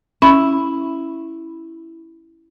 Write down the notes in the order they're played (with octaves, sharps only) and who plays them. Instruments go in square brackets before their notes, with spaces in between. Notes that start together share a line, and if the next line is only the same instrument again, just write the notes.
[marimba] C#4 [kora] E4